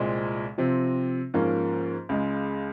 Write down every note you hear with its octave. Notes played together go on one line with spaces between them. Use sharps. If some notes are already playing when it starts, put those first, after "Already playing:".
Already playing: C2 A#2 G#3 C4
C3 F3 C4
G#2 F3 A#3 C#4
C#2 C#3 G#3